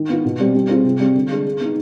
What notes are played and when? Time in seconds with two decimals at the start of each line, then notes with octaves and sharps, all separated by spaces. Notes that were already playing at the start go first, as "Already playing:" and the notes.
Already playing: D#3
0.09 B3 F4
0.25 B2
0.40 G3 C4
0.55 G3
0.69 C4 F4 G#4
0.84 C3
1.00 G3 C4
1.15 D3
1.31 G#3 D4
1.46 G#3
1.60 B3 D#4